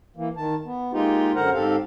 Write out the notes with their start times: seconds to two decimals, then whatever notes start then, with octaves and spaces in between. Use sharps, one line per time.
0.16 E3 A#3
0.37 D#3 A5
0.65 B3
0.93 G#3 A#3 D#4 F4 G4
1.36 F#2 D3 A#4 C5 F#5 A#5
1.54 G#2 C4 G4 A4 F5